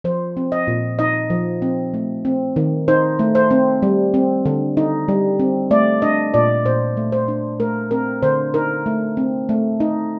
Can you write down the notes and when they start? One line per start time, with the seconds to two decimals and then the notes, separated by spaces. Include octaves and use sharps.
0.04 F3 C5
0.37 C4
0.52 D#5
0.67 A#2
0.99 D#4 D#5
1.30 F3
1.62 C4
1.94 A3
2.25 C4
2.56 D#3
2.88 D#4 C5
3.19 A3
3.35 C5
3.51 C4
3.82 G3
4.14 C4
4.46 D3
4.77 D#4
5.08 G3
5.39 C4
5.71 A3 D5
6.02 D4 D#5
6.34 A#2 D5
6.65 A#2 C5
6.97 A3
7.12 C5
7.28 D4
7.60 A3 A#4
7.91 C4 A#4
8.23 D3 C5
8.54 D#4 A#4
8.86 A3
9.17 C4
9.49 A3
9.80 D#4